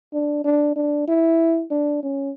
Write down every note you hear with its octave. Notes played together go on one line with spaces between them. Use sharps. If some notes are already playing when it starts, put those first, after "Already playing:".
D4
D4
D4
E4
D4
C#4